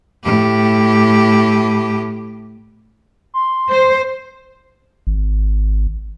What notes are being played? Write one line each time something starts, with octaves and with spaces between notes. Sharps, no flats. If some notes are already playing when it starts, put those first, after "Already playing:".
A2 G4
C6
C5
G#1